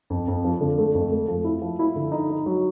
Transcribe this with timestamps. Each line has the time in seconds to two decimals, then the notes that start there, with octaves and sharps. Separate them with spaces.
0.10 F2
0.28 F2
0.45 F3
0.61 D3
0.78 A3
0.94 F2
1.12 A3
1.28 F3
1.45 E4
1.62 F3
1.79 E4
1.96 D3
2.12 D#4
2.29 D#4
2.46 F#3